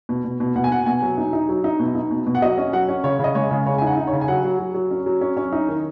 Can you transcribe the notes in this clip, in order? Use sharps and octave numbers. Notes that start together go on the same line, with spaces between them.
B2
B2
B2
B2 F#5
G#5
B2 F#5
B2 G#5
F#3
D#4
D#4
F#3
D#4
B2
D#4
B2
B2
F#5
F#3 D#5
C#4
F#3 F#5
C#4
C#3 C#5
C#3 D#5
G#3 C#5
C#3
C#3 C#5
D#4 G#5
F#5
D#4
C#5
C#3
G#5
F#3 F#5
F#3
F#3
F#3
C#4
F#3
C#4
C#4
D#4
D#3